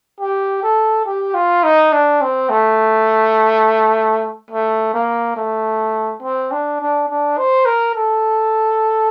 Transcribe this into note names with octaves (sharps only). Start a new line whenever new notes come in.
G4
A4
G4
F4
D#4
D4
C4
A3
A3
A#3
A3
C4
D4
D4
D4
C5
A#4
A4